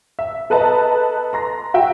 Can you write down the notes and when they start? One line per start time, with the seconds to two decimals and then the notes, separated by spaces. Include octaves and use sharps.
0.19 E5
0.50 A4 B4 D#5 A5 A#5
1.33 A#5 C6 A#6
1.74 F#4 E5 G5